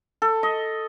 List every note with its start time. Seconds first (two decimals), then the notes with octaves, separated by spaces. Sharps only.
0.22 A4
0.43 D#5